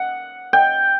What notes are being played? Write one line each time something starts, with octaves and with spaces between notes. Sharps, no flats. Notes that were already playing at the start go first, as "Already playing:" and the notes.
Already playing: F#5
G5